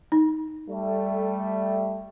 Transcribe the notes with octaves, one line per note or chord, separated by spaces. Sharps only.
D#4
G3 A3